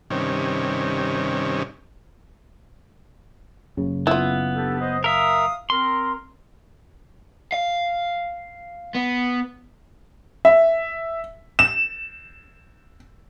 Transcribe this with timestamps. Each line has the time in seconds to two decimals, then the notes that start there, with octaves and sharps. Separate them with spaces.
0.10 G2 C3 D#3 C#4
3.77 F#1 C#3
4.07 B3 E4 F4
4.55 D4 G4 A4
4.80 C5 D#5
5.04 A#4 E5 F5 D#6
5.70 C4 A#4 C6
7.52 F5
8.95 B3
10.45 E5
11.59 E7